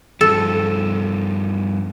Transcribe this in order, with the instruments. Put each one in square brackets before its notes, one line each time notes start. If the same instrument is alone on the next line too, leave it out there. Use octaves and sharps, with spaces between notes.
[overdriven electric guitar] G2 F3 [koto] A4